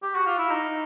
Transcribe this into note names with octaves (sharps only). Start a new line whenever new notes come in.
G4
F#4
F4
E4
D#4